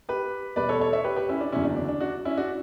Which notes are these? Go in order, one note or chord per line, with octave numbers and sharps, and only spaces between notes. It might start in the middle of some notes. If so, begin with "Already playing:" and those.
G4 B4
E2 B2 G3 B4 D5
A4 C#5
A4 C#5
C#5 E5
G4 B4
G4 B4
C#4 E4
D4
F#1 E2 D3 F#3 C#4 E4
D4
D4
D4
D4 F#4
C#4 E4
D4 F#4